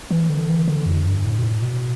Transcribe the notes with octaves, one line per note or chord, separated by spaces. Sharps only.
E3
D3
E3
D3
F2
G2
A2
B2
A2
B2